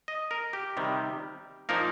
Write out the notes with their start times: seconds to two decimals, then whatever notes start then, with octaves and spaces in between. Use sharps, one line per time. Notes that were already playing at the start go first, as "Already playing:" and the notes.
0.08 D#5
0.31 A#4
0.53 G4
0.77 C3 D#3 G3
1.69 A#2 F3 A#3 D#4 A#4